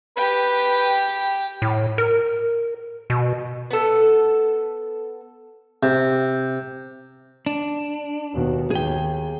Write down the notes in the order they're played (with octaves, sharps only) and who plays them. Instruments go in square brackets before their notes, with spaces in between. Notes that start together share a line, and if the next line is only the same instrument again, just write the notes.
[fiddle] G4 G5 [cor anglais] B4
[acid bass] A2
A#4
B2
[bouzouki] B3 A4
[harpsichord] C3
[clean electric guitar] D4
[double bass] D#2 B2
[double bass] D#2 [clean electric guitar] G#4 G5